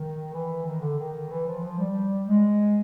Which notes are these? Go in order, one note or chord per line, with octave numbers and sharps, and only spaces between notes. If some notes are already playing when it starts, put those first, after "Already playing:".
Already playing: D#3
E3
D#3
D3
D#3
E3
F3
F3
G3
G#3